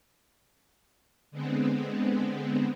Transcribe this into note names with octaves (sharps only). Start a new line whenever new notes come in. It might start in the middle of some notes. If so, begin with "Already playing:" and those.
D3 G#3 B3 C4